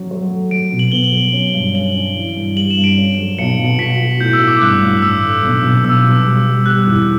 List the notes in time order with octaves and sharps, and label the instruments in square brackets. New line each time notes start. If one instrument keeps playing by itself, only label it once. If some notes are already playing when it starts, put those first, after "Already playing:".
Already playing: [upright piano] F#3 C#4
F#3
A3
[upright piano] F#3 [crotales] D7
[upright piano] B2
[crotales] F#7
[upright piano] B3 [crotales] G7
[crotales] F#7
[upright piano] F#3
C#4
G2
[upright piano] C#4 [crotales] F#7
[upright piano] C#4
E3
G2
[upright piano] G3 [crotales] F#7
[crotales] E7
[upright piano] G2
[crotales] D7
[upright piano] C#4
F#3
[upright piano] B1 [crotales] C#7
[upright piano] B2
[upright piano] F#4 [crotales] B6
[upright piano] F#4
[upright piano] A2 [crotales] G6
[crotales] E6
[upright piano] F#4
[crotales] D6
[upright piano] G2 [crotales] F#6
[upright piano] A1
[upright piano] A1 [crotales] E6
[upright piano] D3
B1
B2
[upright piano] B1 [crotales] E6
[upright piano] B2
G3
G3
[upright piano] G3 [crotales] F#6
[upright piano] E2